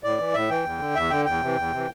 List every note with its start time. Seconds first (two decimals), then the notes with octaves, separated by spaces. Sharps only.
0.04 A2 D5
0.18 E3
0.34 A2 E5
0.50 E3 G5
0.65 E2
0.79 D3
0.95 E2 E5
1.10 D3 G5
1.25 E2 G5
1.41 C3 E3
1.57 E2
1.72 C3 E3